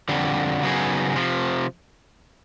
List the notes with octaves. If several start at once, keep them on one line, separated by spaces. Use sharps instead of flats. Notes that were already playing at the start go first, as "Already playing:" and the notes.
F2 D3 G3
C#3 F#3 B3 D#4 G#4
C3 F3